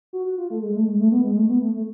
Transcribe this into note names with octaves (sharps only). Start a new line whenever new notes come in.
F#4
F#4
F4
A3
G#3
A3
G#3
A3
B3
G#3
A3
B3
A3
A3